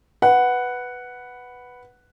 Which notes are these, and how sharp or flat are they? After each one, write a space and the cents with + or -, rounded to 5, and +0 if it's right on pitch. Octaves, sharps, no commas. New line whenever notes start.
B4 +0 F#5 +0